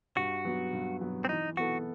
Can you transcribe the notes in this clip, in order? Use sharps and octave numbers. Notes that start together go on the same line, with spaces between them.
G2 F#4
F#3 B3
G2
F#3 B3
C4
E3 D#4
B3 E4 F#4 A4